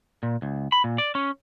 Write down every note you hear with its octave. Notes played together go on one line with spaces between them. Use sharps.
A#2
C#2
B5
A#2
D5
C#4